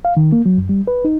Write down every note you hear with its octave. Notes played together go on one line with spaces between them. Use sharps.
F5
D#3
A#3
F#3
F#2
G3
B4
D#4